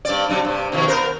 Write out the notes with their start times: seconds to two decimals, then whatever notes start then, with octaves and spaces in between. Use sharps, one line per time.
0.05 G2 C4 D5
0.30 C3 F#3 D4
0.45 G2 C3
0.72 B2 D#3 F3
0.88 B3 A#4 C5